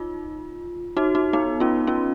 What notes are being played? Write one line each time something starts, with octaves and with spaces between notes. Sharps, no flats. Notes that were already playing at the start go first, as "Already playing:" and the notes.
Already playing: D#4 F4
D#4 F#4
D#4 F#4
B3 D#4
C#4 F4
C#4 F4